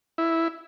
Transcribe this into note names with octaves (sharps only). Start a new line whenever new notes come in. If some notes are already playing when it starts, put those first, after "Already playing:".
E4